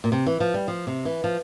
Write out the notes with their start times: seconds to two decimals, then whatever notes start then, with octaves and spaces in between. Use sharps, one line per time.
0.04 A#2
0.12 C3
0.26 E3
0.40 F3
0.54 G3
0.68 F3
0.87 C3
1.05 E3
1.24 F3